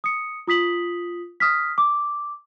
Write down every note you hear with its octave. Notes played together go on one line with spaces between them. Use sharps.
D#6 C#7
F4 D#6 B6 F#7
D#6 F6 B6
D6